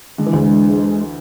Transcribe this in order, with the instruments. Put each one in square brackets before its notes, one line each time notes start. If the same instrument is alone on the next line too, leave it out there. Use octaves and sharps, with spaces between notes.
[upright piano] D3 [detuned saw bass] G#3
[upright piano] E3
D2 D3